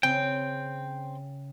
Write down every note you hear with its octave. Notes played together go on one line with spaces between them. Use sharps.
C#3 C4 G5